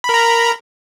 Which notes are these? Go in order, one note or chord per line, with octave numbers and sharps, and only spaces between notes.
A#4 A#5 B5